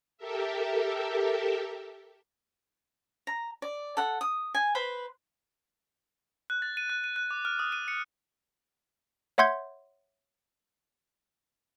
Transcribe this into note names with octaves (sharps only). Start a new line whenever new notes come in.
G4 A4 A#4 E5
A#5
D5
A4 F#5
D#6
G#5
B4 C5 B5
F#6
A6
D#7
F#6
D#7
F#6
D6
F6
D#6
D#7
C#7
C#5 E5 F#5 C6 G6 G#6